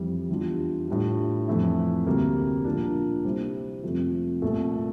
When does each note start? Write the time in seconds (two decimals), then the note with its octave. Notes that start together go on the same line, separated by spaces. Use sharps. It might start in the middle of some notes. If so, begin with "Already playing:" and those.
Already playing: F2 E3 G3
0.29 E2 E3 G3 D4 F4
0.88 A2 G3 D4 F4
1.48 F2 E3 A3 E4
2.06 D2 C3 G3 A#3
2.65 A#2 F3 A#3 D4
3.25 C3 G3 C4 E4
3.83 F2 C3 F3 A3
4.42 C2 A#2 A3